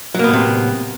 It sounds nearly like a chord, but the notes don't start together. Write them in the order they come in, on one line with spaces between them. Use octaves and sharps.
F#3 A#3 B3 A2 C3